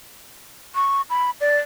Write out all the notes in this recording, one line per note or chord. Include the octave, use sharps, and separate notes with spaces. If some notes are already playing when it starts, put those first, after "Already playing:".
C#6
B5
D5